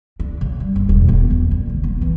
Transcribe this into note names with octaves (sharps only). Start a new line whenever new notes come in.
D4
C#3
G3
G1
E1
B3
F#1
D3
E1
B3
E3